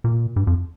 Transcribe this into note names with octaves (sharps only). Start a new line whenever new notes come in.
A#2
G2
F2